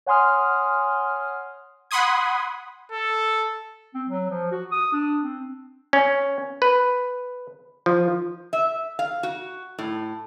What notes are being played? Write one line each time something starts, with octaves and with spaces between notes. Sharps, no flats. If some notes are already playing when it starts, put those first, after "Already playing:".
C#5 F#5 G#5 C6 D#6 F6
F#5 B5 C6 D#6 G#6
A4
C4
F#3
F3
F#4
D#6
D4
C4
C#4
B4
F3
E5
F5
F#4
A2